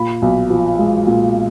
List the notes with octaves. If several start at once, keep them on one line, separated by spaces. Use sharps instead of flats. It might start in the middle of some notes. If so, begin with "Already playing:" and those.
Already playing: A#2 B5
B1
F3
G#3
A#2